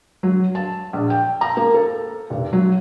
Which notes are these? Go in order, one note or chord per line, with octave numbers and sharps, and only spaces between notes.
F#3
A5
A#1
G5
A#5
A#3
A4
F1
F#3